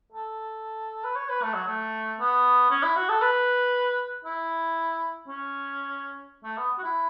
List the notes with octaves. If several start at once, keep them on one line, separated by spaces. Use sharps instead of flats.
A4
B4
C#5
B4
A3
F#3
A3
B3
C#4
E4
F#4
A4
B4
E4
C#4
A3
B3
F#4
E4